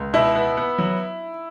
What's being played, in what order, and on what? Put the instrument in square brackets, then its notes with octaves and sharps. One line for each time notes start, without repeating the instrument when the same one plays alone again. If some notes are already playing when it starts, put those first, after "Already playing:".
Already playing: [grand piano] C#2
[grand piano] B2 [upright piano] E4
[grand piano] B3
B3
F#3